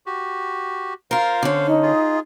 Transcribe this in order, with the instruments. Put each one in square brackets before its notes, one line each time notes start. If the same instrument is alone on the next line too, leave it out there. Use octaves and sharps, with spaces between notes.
[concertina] F#4 G4
[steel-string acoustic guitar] F4 A#4 [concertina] C5 F5
[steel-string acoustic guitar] D3 C#4
[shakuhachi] D#4
[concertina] F4 G#4